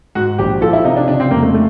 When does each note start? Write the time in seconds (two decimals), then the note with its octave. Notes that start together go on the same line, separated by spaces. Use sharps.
0.15 G#2 F#4
0.38 A#1 G4
0.61 F3 A4
0.73 E4
0.85 C3 D#4
0.96 D4
1.08 C#3 D4
1.20 C4
1.31 F2 A#3
1.42 A3
1.54 A3